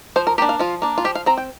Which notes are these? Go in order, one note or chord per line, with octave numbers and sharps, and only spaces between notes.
F3 C5
A#4
A#3 D4 G4
F5
F3 F4
A#3 D4
F4
F3 G4
F5
C4 A#5
G5